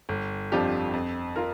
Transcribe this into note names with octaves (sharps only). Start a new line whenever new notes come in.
G1
F2 F3 D4 G4
F2
F4 A#4